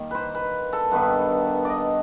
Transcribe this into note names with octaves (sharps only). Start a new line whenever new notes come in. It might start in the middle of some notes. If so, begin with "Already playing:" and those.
Already playing: D#3 G3 A#3
B4 C5
B4
A4
G2 D#3 G3 B3 B4
D5 D#5